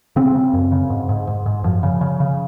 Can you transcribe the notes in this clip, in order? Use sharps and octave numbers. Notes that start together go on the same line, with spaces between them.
C#3 C4
C#3
F#2
C#3
G#2
G#2
G#2
G#2
F#2 F3
C#3
C#3
C#3